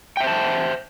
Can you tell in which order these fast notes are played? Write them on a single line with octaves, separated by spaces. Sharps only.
G5 E5 C5 A5